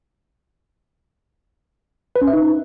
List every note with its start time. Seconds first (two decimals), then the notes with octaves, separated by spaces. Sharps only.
2.16 B4
2.22 C#4
2.27 E5
2.33 D#4